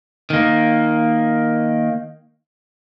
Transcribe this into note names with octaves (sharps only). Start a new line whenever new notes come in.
D#3 A#3